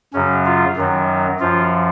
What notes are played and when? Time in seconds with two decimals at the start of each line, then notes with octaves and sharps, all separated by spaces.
0.14 F#2 C#3 F#3 C#4
0.46 F4
0.77 F#2 D#3 F#3
1.40 F#2 F3 F4